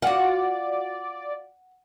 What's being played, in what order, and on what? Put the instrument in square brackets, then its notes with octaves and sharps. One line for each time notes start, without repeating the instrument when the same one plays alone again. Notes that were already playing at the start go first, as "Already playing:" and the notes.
[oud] F4 F#4 [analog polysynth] D5 [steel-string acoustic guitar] F#5